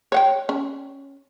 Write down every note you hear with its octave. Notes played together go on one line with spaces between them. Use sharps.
C#5 F#5 G5
C#4